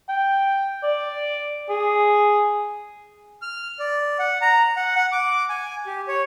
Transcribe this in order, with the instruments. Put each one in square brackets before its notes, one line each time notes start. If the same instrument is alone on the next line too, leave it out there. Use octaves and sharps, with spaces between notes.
[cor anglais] G5
D5
G#4
[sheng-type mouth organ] F6
D5
F#5
A#5
F#5
F#5
D6
G#5
G4
C#5